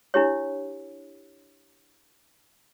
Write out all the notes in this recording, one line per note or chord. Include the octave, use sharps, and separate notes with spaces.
D4 E4 G4 C#5